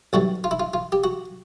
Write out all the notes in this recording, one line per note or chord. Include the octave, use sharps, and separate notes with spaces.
B1 A2 E3 G3 F#4
F4
E4
F4
F4
G4
F#4